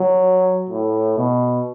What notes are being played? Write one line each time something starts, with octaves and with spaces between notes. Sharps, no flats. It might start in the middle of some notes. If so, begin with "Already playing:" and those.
Already playing: F#3
A2
B2